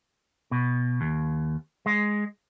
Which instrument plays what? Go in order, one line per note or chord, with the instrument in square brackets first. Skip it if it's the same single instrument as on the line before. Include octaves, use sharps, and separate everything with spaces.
[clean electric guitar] B2
D#2
G#3